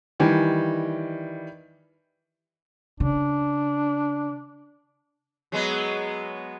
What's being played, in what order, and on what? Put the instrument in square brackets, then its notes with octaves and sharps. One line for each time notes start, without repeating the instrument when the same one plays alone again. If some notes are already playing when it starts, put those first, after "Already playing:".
[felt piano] D#3 E3 G3
[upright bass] C#3 [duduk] D4
[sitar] F#3 G#3 B3